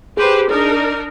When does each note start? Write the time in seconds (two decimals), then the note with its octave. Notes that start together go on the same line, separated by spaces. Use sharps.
0.17 G4 G#4 B4 C5
0.49 D4 D#4 A#4